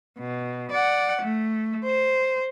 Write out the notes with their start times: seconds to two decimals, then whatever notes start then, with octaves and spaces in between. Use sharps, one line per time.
0.19 B2
0.71 D5 F#5
1.22 A3
1.85 C5